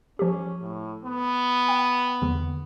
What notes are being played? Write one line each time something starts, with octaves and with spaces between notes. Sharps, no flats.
F3 C#4 G4
A2
B3
G5
E2 D3